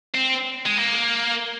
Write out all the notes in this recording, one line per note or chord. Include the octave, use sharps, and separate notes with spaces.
C4
G#3
A#3